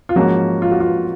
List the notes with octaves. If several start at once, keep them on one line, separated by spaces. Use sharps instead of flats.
F4
G#2 F3 A#3 C#4 F#4
F4
F#4
F4